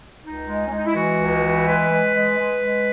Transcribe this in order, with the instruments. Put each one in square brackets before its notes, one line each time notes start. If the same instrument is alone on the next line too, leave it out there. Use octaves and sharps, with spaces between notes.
[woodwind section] C#2 D#4
G#3
C#4
G#3 D#4
E4
E3 F#4
C#2
E3
G#3 B4
G#3
G#3
G#3
G#3